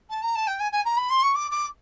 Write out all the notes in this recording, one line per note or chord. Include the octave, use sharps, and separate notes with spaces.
A5
A#5
A5
G5
G#5
G#5
A#5
B5
C6
C#6
D6
D6